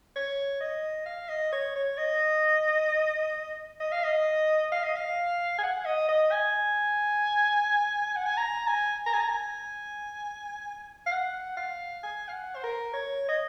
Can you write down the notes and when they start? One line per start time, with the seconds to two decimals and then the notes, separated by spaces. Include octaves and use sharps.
0.16 C#5
0.60 D#5
1.06 F5
1.29 D#5
1.52 C#5
1.75 C#5
1.97 D#5
3.80 D#5
3.92 F5
4.04 D#5
4.72 F5
4.83 D#5
4.96 F5
5.58 G#5
5.63 F#5
5.85 D#5
6.09 D#5
6.31 G#5
8.16 F#5
8.26 G#5
8.37 A#5
8.67 G#5
9.06 A#5
9.13 G#5
9.20 A#5
9.29 G#5
11.06 F5
11.12 F#5
11.57 F5
12.03 G#5
12.28 F5
12.33 F#5
12.55 C5
12.63 A#4
12.93 C#5
13.28 D#5